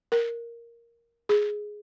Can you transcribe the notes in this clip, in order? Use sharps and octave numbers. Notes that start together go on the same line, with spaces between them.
A#4
G#4